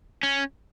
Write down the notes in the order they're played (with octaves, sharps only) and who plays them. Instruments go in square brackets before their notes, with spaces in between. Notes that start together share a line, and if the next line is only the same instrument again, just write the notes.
[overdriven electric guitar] C#4